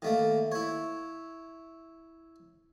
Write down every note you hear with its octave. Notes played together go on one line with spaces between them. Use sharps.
D#3 A3 A#3
E4 C#5